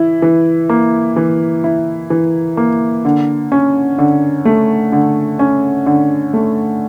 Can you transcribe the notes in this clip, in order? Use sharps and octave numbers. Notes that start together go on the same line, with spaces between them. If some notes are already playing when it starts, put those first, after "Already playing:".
Already playing: E3 E4
E3
A#3
E3
E4
E3
A#3
D3
C#4
D3
A3
D3
C#4
D3
A3